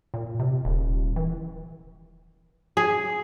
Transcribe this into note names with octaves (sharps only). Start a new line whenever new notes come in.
A#2
C3
D#1
E3
G#4